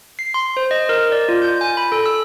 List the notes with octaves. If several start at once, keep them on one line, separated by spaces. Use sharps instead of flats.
C7
C6
C5
D#5
A#4
D5
F4
G6
G#5
B5
A4
E6